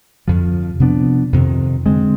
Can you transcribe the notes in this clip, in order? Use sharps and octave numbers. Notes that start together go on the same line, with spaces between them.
F2 D3 F3
C3 F3 B3 D4
F2 C3 D#3
D3 G#3 C4